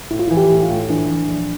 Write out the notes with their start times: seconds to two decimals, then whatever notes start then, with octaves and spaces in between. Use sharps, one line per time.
0.11 A2 E4
0.19 F4
0.28 E4
0.31 E3
0.37 G4
0.50 A2
0.63 F4
0.69 A2
0.89 E3 D4
1.08 E3
1.28 A#1